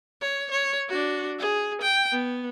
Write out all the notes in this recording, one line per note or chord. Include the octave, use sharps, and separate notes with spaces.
C#5
C#5
D4 F#4
G#4
G5
B3